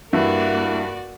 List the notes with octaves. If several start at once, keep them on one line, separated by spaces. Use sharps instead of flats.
G2 A#3 E4 F#4 D5